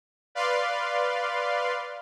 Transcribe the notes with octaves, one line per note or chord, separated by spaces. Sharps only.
B4 D5 F5 C6